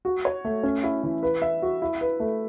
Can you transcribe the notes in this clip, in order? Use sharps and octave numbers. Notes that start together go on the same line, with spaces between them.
F#4
C#5
A3
C#4
E4
E3
B4
E5
F#4
E4
B4
A3